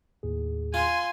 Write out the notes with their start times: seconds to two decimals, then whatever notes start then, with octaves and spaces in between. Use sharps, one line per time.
0.23 D#2 A2 G#4
0.74 F4 G#5 C6